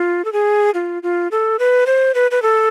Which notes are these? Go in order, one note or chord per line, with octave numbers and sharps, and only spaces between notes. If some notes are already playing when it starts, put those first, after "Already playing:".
Already playing: F4
A4
G#4
F4
F4
A4
B4
C5
B4
B4
A4